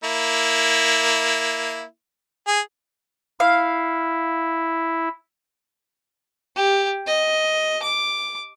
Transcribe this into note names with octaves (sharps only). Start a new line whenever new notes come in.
A#3 E4
G#4
E4 F5
G4
D#5
D6